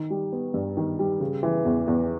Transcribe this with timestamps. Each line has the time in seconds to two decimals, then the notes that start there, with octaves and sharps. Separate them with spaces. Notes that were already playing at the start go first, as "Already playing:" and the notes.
Already playing: D#3
0.10 G3
0.32 B3
0.54 G2
0.77 D#3
0.99 G3
1.20 C#3
1.43 E3
1.65 E2
1.87 E2